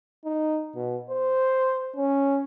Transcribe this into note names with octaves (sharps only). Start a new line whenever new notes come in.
D#4
B2
C5
C#4